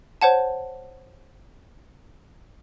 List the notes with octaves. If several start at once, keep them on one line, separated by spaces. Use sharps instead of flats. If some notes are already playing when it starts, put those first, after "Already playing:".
C5 C#5 F#5 A5